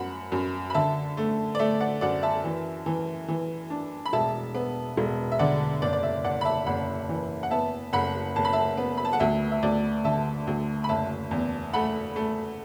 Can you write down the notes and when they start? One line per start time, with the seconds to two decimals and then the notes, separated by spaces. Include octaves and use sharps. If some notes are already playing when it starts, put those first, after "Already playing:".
Already playing: F#2 F#5 B5
0.32 F#2
0.70 B5
0.74 D3 E5 A5
1.17 A3
1.55 D5
1.59 A3 E5
1.80 D5 F#5
2.01 F#2 D5 F#5
2.23 E5 A5
2.44 E3
2.86 E3
3.28 E3
3.70 D4
4.06 B5
4.13 E1 E5 A5
4.55 B3
4.97 E1
5.32 E5
5.39 D3 D5 F#5
5.82 F#1 D5
5.93 D5
6.03 E5
6.24 F#1 D5 F#5
6.41 B5
6.45 E5 A5
6.66 F#1 F#5 B5
7.09 E3
7.43 F#5
7.51 B3 E5 A5
7.93 F#1 F#5 B5
8.36 F#1 A5
8.45 B5
8.53 E5 A5
8.77 B3
8.98 B5
9.05 A5
9.13 F#5
9.20 D2 E5
9.51 E5
9.63 D2 D5
10.04 D3 E5 A5
10.47 D2
10.84 B5
10.89 F#1 E5 A5
11.31 E2
11.73 A3 F#5 B5
12.16 A3